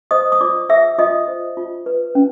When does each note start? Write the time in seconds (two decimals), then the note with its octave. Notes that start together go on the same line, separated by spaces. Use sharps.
0.11 C5 D#5 D#6
0.32 D#6
0.41 F4 D5 D6
0.69 G#4 E5 E6
0.99 F4 D#5 D#6
1.28 C5
1.57 F4
1.86 B4
2.15 C#4